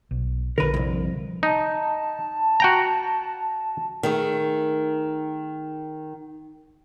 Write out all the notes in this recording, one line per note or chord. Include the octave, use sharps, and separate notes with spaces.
B1
A#1 D3 A#4 B4
C2 F2
D#4 A5
F#4 G5 A#5
D#3 A3 G#4